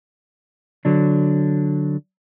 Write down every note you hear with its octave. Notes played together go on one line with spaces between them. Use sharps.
D3 F#3 D4